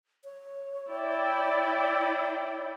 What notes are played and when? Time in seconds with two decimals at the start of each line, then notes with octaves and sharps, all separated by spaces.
0.24 C#5
0.91 E4 D5 G5